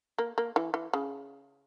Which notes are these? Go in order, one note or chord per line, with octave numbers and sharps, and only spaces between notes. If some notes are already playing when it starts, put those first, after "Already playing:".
A#3
A#3
E3
E3
C#3